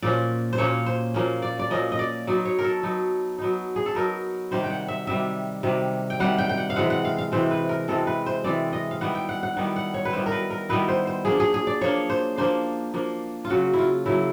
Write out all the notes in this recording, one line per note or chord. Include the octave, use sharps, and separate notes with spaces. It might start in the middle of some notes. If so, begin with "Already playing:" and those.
A#2 F3 A#3 C#4 D5
C5
A#2 F3 A#3 C#4 C#5
C5
A#2 F3 A#3 C#4
D5
D5
A#2 F3 A#3 C#4 D#5
D#5
D5
F#3 B3 D#4 D5
C#5
A#4
A4
F#3 B3 D#4
F#3 B3 D#4
G#4
A4
F#3 B3 D#4 A#4
C3 D#3 G3 C5
G5
F#5
E5
C3 D#3 G3 E5
C3 D#3 G3
G5
C3 D#3 G3 F#5
G5
G5
F#5
F5
C3 E3 G#3 C4 F#5
F#5
F5
F5
C3 E3 G#3 C4 C5
B4
A#4
C3 E3 G#3 C4 A4
B4
C5
C3 E3 G#3 C4 D5
D#5
F5
D#3 G3 B3 E4 F#5
G5
F#5
F#5
D#3 G3 B3 E4 F#5
F#5
C#5
B4
D#3 G3 B3 E4 C5
A#4
B4
A#4
D#3 G3 B3 E4 B4
C5
C5
F3 A#3 D4 G#4
G#4
G#4
D5
F3 A#3 D4 C#5
C5
F3 A#3 D4 C5
F3 A#3 D4
F4
C#3 F#3 A#3 F#4
E4
F4
C#3 F#3 A#3 E4